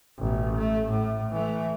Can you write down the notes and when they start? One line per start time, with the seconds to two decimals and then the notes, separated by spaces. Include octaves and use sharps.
0.18 A1 B2
0.56 A3
0.89 A2
1.32 E3 A3